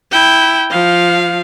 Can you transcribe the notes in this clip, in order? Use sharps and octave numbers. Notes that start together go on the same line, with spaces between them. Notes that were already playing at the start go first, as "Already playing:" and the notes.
E4 G5
F3 F5